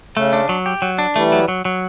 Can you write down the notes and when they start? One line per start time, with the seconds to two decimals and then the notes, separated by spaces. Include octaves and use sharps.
0.16 C#3 A3
0.33 D4
0.49 F#3
0.66 G4
0.82 F#3
0.98 D4
1.16 E3 G3 A3
1.32 F#3
1.48 F#3
1.65 F#3